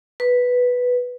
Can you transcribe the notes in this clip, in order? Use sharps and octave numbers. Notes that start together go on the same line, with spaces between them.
B4